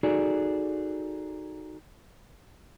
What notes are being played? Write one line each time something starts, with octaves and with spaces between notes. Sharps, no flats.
D#4 F#4 G#4 A4 D5